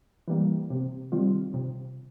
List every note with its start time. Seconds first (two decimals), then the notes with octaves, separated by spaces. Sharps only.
0.28 E3 G3 A#3
0.70 C3
1.12 D#3 G3 C4 F4
1.54 C3